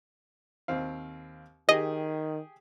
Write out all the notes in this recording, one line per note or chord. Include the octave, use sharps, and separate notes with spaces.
D#2 C4 F5
D#3 G4 G#4 D#5